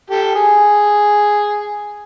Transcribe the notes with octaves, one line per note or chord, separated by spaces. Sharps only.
G4 A4
G#4